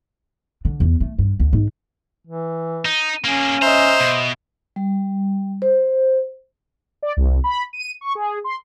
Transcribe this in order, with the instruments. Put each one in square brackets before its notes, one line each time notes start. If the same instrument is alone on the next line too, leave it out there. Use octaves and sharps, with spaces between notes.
[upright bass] D3
E2
A3
G2
D2
G#2
[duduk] E3
[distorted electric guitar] D#4
[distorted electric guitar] A#3 G#4 [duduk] C#4
[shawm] C5 [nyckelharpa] D#5 E5 [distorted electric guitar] A#5
[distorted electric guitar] B2
[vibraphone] G3
C5
[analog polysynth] D5
C2
B5
D#7
C#6
G#4
C6